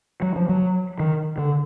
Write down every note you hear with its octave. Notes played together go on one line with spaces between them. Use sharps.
F#3
F3
F#3
D#3
D3